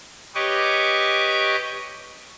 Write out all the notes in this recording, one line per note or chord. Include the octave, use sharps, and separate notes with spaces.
G4 B4 C#5 D#5 C#6 D6